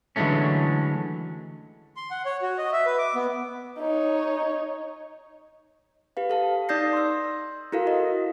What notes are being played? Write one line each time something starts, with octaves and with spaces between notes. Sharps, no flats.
D3 E3 F#3 G#3 A3 C#4
C6
F#5
C#5
F#4
D#5
E5
B4
D6
B3
D#4 C#5
G4 B4 F5
A4 F5 A5
D#4 D5 D#6 G6 A#6 C7
C6 E6
E4 F#4 A4 A#4 F5
F#4 D#5